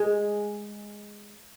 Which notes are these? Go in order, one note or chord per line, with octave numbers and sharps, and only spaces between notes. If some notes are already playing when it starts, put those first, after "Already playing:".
Already playing: G#3